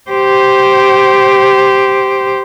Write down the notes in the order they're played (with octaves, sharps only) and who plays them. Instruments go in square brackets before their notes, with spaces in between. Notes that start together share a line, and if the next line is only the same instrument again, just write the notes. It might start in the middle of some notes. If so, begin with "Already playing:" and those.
[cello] G4 C5